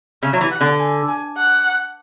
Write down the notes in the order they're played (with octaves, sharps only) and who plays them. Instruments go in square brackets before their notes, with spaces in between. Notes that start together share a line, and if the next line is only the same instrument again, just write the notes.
[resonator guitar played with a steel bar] C#3 [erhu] E5
[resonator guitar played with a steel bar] F#3
E3
[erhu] F#5
[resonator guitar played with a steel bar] D3
[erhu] G#5
G#5
F#5